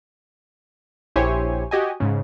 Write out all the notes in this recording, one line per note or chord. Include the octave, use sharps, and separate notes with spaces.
A#1 E4 G4 C5 C#5 G#5
F#4 G4 D#5 G#5
G#2 C#3